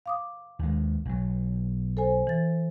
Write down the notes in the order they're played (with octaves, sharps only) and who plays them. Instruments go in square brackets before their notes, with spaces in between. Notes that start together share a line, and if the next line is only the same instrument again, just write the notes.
[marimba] F5 D6 D#6
[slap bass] D#2 G#3
B1 F#3
[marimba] A4 C5 G#5
E3 A6